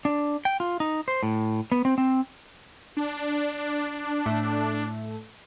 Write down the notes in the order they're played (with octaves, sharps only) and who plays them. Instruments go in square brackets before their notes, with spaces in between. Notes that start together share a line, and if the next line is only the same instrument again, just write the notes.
[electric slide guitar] D4
G5
F4
D#4
C5
A2
B3
C4
C4
[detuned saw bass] D4
[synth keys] A2 A3